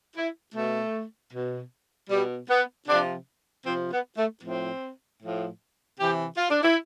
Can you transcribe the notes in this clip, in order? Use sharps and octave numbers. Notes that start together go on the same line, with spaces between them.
E4
B2 A3
B2
B2 G3
B3
C3 F3 D4
C3 F3 C4
B3
A3
A2 F3 C4
A2 F3
C3 E3 G4
F4
D4
E4